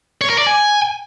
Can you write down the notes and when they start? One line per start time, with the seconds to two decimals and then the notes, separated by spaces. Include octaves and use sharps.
0.21 C#5
0.30 A#4
0.38 D5
0.47 G#5